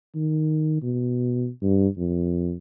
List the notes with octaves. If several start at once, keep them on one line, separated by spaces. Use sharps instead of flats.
D#3
B2
G2
F2